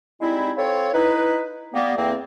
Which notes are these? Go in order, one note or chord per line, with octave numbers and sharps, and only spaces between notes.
G3 G#3 C4 D#4 E4
C4 F4 A4 C#5
D#4 E4 B4
G3 A#3 B3
E2 A3 A#3 C4